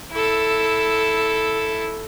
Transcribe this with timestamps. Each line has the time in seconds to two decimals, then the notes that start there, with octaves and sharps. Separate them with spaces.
0.12 E4 A4